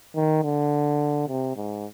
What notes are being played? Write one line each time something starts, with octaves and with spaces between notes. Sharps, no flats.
D#3
D3
C3
G#2